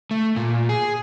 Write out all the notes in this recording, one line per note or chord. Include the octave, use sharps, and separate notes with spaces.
A3
A#2
G#4